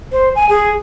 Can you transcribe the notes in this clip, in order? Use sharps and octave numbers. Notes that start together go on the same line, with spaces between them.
C5
G#5
G#4